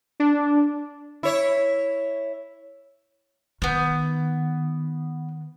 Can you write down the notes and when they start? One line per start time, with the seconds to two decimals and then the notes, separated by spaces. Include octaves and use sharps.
0.20 D4
1.23 E4 C#5
3.62 D#3 B3 G6